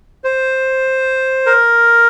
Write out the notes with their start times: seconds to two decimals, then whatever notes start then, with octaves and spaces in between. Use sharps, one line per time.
0.24 C5
1.46 A#4